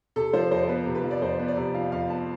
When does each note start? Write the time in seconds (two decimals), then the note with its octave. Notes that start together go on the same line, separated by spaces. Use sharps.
0.16 C3 A4
0.33 F3 C5
0.51 F2 C5
0.63 C5
0.69 B3 B4
0.86 C3
0.95 B4
1.04 F3
1.11 D5
1.22 F2 C5
1.39 B3
1.48 D5
1.57 C3
1.74 F3 F5
1.92 F2 F5
2.10 B3 A5